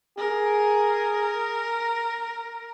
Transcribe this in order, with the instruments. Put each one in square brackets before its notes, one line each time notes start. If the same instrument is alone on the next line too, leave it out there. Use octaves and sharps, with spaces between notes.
[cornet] G#4 [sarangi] A#4